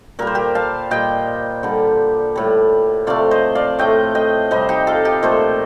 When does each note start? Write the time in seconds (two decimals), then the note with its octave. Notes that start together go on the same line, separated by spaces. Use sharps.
0.19 A#2 G3 A#4
0.27 C5
0.35 G4 A#4
0.55 F5 A5
0.91 A#2 G3 D#5 G5
1.63 D3 G3
2.36 A2 G3
3.07 C3 F3 A3 D5 F5
3.31 C5 D#5
3.55 D5 F5
3.79 A2 A3 D#5 G5
4.15 D#5 G5
4.51 C3 G3 C5 D#5
4.69 D#4 G4
4.87 F4 A4
5.05 D#4 G4
5.22 A#2 F3 A3 C5 D#5